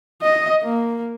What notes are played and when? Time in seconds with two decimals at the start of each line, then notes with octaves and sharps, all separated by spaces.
0.22 D#5
0.63 A#3